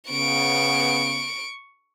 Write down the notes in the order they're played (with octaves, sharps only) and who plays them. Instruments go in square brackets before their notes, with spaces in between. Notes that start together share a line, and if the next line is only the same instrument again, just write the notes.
[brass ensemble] C#3 B3 [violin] C#6 D7